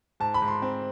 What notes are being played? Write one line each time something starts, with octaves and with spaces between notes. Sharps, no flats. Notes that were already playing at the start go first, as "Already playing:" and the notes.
G#2 A5
B5
G#2
C6
C4